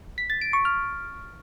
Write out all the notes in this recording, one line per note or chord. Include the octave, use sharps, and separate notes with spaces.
B6
A6
D7
C#6
F6